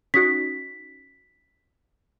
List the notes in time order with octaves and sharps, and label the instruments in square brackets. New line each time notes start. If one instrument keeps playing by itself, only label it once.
[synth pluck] C#4 D#4 F#4 [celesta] B6